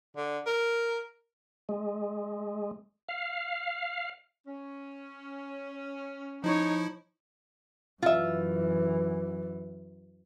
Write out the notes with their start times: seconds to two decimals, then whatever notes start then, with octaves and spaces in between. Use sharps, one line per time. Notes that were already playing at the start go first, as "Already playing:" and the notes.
0.16 D3
0.46 A#4
1.69 G#3
3.09 F5
4.47 C#4
6.44 F3 D#4 E4 C#5
8.02 F#2 E3 F4 E5